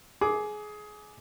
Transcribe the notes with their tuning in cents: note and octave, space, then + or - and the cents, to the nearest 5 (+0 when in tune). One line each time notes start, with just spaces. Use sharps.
G#4 +20 D6 +0